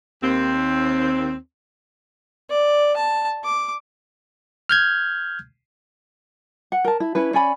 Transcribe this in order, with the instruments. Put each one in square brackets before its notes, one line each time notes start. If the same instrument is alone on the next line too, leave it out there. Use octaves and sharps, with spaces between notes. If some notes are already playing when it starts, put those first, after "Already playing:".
[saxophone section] D#2 C4
[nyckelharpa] D5
A5
D6
[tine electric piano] F6 G6 G#6
[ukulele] F#5
A#4 A5
E4
C#4 E4 B4
C#4 D5 G#5 B5